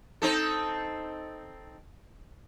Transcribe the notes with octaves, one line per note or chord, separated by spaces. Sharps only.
C4 D#4 A4